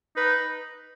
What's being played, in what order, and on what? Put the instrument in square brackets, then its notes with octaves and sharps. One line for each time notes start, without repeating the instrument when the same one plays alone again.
[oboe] D#4 [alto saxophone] B4